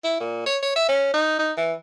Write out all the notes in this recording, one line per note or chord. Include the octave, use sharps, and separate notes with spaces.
E4
A#2
C#5
C#5
E5
C#4
D#4
D#4
E3